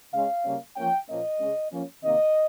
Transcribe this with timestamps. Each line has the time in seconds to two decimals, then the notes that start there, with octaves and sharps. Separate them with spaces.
0.13 C#3 G#3 C#4 F5
0.45 C#3 G3 A#3 C#4
0.76 F3 A#3 C#4 G5
1.08 A#2 F3 A#3 C#4 D#5
1.40 C#3 G#3 C#4
1.72 F3 A#3 C#4
2.03 C3 D#3 A#3 D#5